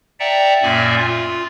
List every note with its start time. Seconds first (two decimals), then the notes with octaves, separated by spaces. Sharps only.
0.20 D5 E5 F#5 G5 A5 A#5
0.63 F#2 A#2 A#3 D5 E5 G#5
0.97 F4